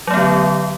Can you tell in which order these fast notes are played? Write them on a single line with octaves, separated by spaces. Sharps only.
F#3 A3 B3 D3